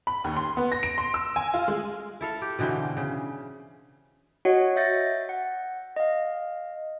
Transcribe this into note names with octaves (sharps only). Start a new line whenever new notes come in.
B5
D#2
C6
B3
A#6
D7
C6
E6
G#5
F4
G#3
E4 A4 F5
G4
B2 D3 E3 C4
C#3
F#4 C#5 D#5 F#5
E5 G6 A6 A#6 C#7
F#5
D#5 F5